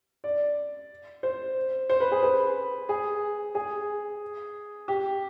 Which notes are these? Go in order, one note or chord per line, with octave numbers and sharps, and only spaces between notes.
D5
C5
C5
B4
G#4
B4
G#4
G#4
G4